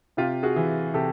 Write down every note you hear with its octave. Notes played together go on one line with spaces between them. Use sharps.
C3 F4 G4
F#4 G#4
E3
C3 G4 A4